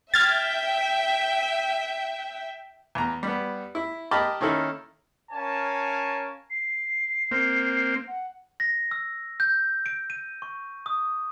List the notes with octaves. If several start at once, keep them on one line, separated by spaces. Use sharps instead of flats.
E5 G5 F6 G#6 A6
E2 A#5
G3 B3
E4
G4 A#4 D#5 A5 B5 D6
D#3 A#3 C#4 D#4 E4 A4
C#4 A#4 C#5 F5 G#5 A5
C7
A#3 C4
F#5
A#6
E6
G6
D7
D#7
C#6
D#6